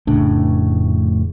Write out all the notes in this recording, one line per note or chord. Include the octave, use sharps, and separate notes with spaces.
F1 A2 C#3 D4